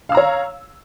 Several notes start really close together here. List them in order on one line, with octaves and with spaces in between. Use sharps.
F5 E6 A#5 C#5